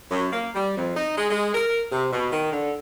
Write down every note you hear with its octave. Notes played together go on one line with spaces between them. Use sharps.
F#2
A#3
G3
F2
D#4
G#3
G#3
A#4
C3
B2
D#3
D3